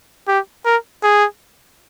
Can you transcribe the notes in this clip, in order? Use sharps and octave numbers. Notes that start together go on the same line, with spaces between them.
G4
A#4
G#4